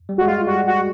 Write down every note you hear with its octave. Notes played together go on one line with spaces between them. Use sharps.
G3
G#3 F#4
F4
G3 F#4
F#4